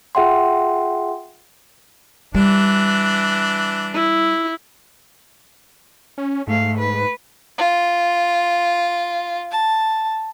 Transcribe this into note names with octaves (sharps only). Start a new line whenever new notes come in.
F4 G#4 E5 F#5 G5 C6
E3 G3 D4
E4
C#4
G#2 A3 F5
B4
F4
A5